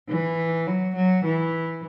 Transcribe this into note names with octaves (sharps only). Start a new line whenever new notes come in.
E3
F#3
F#3
E3